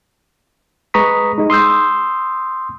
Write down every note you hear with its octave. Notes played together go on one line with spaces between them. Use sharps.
G#3 B4 A#5 C#6 D#6 B6
G#3 D#4
C6 D#6 E6 G6